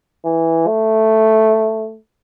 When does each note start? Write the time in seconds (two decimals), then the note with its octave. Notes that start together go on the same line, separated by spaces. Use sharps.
0.25 E3
0.67 A3